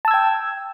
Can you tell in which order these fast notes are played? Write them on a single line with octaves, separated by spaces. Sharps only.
A5 E6 G#6 G5